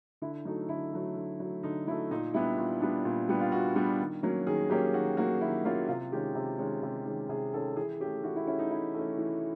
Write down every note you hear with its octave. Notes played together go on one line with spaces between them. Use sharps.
D3 E4
F#3 A3 D#4
D3 E4
F#3 A3
D3
F#3 A3
D3 D#4
F#3 A3 E4
A#2 D#4
G3 B3 D4 E4
A#2
G3 B3 D4
A#2
G3 B3 D4
F4
A#2 F#4
G3 B3 D4
D#3
F#3 A#3 C#4
D#3 G#4
F#3 A#3 C#4 G4
D#3 F#4
F#3 A#3 C#4 F#4
D#3 E4
F#3 A#3 C#4 F4
C3 F4
D#3 G#3 C#4 G4
C3
D#3 G#3 C#4
C3
D#3 G#3 C#4
C3 G#4
D#3 G#3 C#4 A4
E3 G#4
A3 C#4 G4
E3 F#4
E4
A3 C#4 E4
D#4
E3 E4
A3 C#4
E3